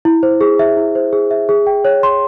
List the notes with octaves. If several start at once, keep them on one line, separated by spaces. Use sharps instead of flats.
E4
C5
G#4
E5
E4
C5
G#4
E5
G#4
G5
C#5
C6